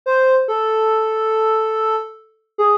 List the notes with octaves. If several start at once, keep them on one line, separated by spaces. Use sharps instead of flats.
C5
A4
G#4